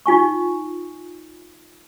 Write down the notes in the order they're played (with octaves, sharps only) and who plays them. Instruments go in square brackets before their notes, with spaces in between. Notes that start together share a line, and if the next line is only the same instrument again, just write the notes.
[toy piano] D#4 F4 G#5 C#6